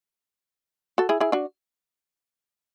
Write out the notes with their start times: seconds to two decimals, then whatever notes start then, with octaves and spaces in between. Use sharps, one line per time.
0.98 F#4 A4
1.09 E4 G#4
1.20 E4 G#4
1.32 D4 F#4